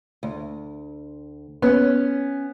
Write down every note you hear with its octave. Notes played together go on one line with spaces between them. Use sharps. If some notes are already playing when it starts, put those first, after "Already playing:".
D2
B3 C#4